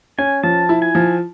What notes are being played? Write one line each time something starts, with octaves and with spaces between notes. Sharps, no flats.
C#4 G#5
F3 A5
E4
G#5
F3